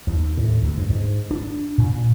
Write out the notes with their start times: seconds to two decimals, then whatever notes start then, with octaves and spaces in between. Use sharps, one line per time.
0.07 D#2
0.37 A2
0.62 D2
0.77 G2
0.90 G#2
1.31 D4
1.78 A#2